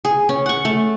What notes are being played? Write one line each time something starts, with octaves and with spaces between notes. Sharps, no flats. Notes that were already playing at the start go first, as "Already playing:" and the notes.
G#4
C#4
F#5 C#6
A3